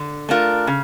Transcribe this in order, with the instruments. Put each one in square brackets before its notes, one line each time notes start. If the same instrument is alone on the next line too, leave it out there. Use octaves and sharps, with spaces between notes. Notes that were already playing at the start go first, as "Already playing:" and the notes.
Already playing: [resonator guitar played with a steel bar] D3
A3 D4 F4 A#4
C#3